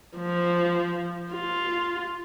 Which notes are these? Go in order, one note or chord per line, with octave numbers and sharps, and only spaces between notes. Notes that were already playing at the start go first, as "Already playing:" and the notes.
F3
F4